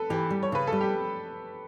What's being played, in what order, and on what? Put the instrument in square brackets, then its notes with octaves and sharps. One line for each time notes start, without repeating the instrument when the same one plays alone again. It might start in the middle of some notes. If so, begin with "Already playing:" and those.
Already playing: [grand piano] A4 B4
[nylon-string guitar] E3 [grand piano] G4
[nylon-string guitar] G3
[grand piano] C#5
[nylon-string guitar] C#3 [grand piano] B4
[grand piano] A4
[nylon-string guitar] G3
[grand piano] G4